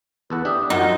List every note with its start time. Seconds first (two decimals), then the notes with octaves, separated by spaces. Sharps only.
0.30 E2 A4 B4 F#5
0.45 D4 G4 E5 D#6
0.70 F#2 D#4 F4